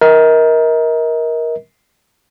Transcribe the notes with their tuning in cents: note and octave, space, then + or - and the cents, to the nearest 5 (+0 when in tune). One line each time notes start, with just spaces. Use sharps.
A#4 +15 D#5 +40